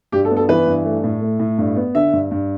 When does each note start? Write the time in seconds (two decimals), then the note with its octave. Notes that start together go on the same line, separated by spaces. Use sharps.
0.12 G2 G4
0.25 A4
0.31 B3
0.37 A4
0.49 E3 B4
0.67 G2
0.85 A3
1.04 A2
1.22 A3
1.40 A2
1.58 G2
1.76 B3
1.95 D3 E5
2.13 G2
2.31 G2